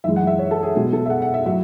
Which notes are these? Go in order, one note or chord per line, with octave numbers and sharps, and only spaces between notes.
F#2 E3 G#3 E5
F#5
E5
C#5
A4
G#4
B2 G#3 G#4
A4
E5
F#5
F#5
E5
A2 F#3 E5